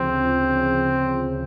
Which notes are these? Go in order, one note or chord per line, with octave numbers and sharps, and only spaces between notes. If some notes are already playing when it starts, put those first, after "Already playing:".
Already playing: D2 C#3 F3 C4
D2 C#3 F3